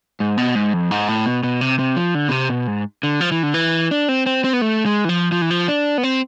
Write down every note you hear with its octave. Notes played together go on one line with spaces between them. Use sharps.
G#2
B2
G#2
F2
G#2
A2
B2
B2
C3
C3
F3
D3
B2
C3
B2
G#2
D3
F3
E3
D3
E3
D4
C4
C4
C4
B3
A3
G#3
E3
F3
F3
E3
F3
D4
B3
C4